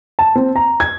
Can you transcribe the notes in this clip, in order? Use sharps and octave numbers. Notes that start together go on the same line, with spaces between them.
A5
C4
A#5
G#6